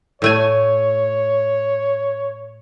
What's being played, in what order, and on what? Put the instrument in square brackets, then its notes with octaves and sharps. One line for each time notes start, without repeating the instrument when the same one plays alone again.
[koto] A2 A3 G#5 [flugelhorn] C#5